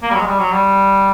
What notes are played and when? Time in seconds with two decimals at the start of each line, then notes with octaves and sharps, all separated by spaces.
0.02 A#3
0.10 G3
0.15 F#3
0.21 G#3
0.27 G3
0.39 F#3
0.52 G3